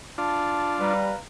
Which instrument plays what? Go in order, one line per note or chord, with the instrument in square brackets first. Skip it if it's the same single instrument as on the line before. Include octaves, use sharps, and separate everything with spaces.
[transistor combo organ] D4 F4 [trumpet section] A5
[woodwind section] G3 [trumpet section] B4 F5 A#5